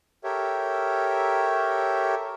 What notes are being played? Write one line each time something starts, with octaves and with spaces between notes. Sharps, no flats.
G4 A4 A#4 C#5 E5